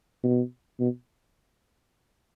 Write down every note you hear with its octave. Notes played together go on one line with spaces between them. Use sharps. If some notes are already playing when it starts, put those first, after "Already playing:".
B2
B2